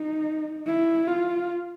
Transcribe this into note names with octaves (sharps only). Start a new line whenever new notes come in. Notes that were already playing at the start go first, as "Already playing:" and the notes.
Already playing: D#4
E4
F4